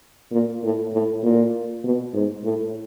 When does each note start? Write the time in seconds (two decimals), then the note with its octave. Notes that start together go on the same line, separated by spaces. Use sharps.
0.32 A#2
0.63 A2
0.93 A2
1.23 A#2
1.84 B2
2.14 G#2
2.44 A2